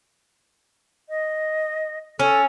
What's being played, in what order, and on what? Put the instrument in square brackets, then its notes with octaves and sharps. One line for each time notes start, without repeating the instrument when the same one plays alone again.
[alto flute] D#5
[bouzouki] C#4 [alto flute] A4